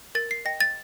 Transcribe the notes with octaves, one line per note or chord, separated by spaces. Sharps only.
A#4 A6
C7
D#5 G5 A#6
A6